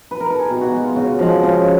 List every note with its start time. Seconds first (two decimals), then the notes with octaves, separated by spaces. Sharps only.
0.11 B4
0.20 A#4
0.30 A4
0.40 G#4
0.50 B2 G4
0.61 F#4
0.73 G#3
0.84 F4
0.96 C#3 F#4
1.19 F3 G#3
1.43 C#3